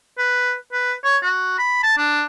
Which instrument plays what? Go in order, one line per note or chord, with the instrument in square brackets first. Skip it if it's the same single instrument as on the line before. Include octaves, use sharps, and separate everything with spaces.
[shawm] B4
B4
C#5
F#4
B5
A5
D4